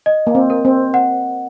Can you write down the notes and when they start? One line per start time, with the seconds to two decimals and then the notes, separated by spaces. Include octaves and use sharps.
0.06 D#5
0.27 A#3
0.35 C4
0.50 A#4
0.65 C4
0.94 F#5